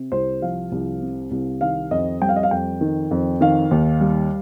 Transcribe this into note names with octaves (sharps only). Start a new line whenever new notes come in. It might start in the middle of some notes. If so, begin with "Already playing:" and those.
Already playing: C3
C2 C5
F3 F5
C2
C3
C2
D#3 F5
F2 D#5
G3 G5
F5
D#5
F5
F2 G5
D#3
F2
D#3 F5
D#2
G3